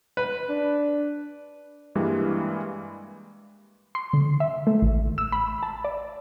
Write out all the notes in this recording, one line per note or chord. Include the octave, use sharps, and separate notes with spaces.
B4
D4
G2 E3 G3 G#3 A#3
C6
D3
E5
A3
A1
E6
B5
A5
D5